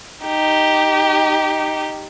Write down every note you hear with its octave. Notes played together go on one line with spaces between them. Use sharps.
D#4 G4